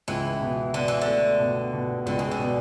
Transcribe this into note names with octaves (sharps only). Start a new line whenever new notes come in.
C#2 E3
B2
B2 D3
E3
D3
A3
B2
B2
C#2 D3
C#3
D3
B2